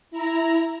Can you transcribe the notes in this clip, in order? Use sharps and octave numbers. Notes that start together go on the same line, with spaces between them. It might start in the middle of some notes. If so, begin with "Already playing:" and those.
E4 A#5